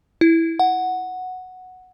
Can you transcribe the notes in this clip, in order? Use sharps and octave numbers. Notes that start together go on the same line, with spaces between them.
E4
F#5